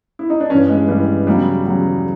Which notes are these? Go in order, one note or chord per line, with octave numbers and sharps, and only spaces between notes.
E4
D#4
D4
G2 E3 C#4
G#3
G2 E3 G3
E2 C#3 F#3 G3
E2 C#3 F#3